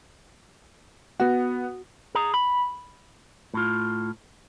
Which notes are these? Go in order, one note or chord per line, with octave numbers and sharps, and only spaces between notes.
B3 F#4 F#5
G#4 A#5
B5
A2 F4